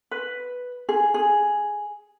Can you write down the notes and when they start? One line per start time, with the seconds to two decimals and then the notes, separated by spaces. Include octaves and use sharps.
0.11 B4
0.89 G#4
1.14 G#4